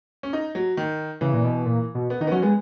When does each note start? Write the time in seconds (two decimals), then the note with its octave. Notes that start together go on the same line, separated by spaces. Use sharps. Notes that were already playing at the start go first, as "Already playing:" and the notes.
0.23 C#4
0.33 D#4
0.55 F#3
0.77 D#3
1.21 C#3 E3
1.33 A#2
1.44 B2
1.65 A#2
1.95 B2
2.10 B3
2.21 D#3 D#4
2.27 B3
2.32 F#3 C#4
2.42 G#3 B3